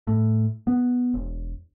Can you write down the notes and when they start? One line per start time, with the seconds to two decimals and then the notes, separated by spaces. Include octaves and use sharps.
0.07 A2
0.67 B3
1.14 E1